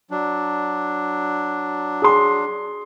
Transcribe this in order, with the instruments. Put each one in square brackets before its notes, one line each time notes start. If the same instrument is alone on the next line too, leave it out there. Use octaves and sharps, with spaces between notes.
[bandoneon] F#3 D4
[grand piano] G#4 C6